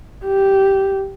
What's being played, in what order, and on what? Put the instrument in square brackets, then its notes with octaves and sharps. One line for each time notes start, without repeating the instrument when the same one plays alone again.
[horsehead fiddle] G4